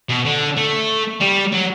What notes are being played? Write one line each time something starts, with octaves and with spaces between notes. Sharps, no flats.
B2
D3
A3
G3
F#3